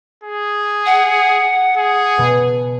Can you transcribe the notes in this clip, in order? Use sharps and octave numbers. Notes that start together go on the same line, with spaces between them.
G#4
F#5
G#4
B2 B3